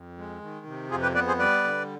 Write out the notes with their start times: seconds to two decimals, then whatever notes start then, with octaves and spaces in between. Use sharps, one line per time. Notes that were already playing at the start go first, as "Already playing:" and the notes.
Already playing: F2
0.18 G#3
0.41 D#3
0.66 C3
0.91 F2 F4 G#4
1.02 G4 B4
1.15 B3 B4 D5
1.27 G#4 C5
1.39 G3 B4 D5
1.64 D3